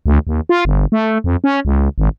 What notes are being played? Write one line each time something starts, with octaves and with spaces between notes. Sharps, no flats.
D2
D#2
F4
G1
A3
F2
C#4
C#2
G#1